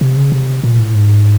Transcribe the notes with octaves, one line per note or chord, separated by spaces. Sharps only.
C3
C#3
C3
A#2
A2
G#2